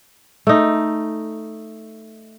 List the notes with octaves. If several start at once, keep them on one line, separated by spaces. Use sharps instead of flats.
A3 D#4